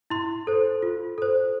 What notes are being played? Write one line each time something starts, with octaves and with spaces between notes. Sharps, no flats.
E4 C6
A4 C5
F4
A4 C5